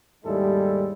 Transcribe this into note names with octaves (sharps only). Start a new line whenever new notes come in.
D#2 G#2 G3 G#3 E4 A4